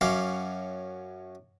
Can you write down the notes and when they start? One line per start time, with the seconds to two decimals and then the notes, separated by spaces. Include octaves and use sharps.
0.01 F#2 F#3 C#4 F5 D6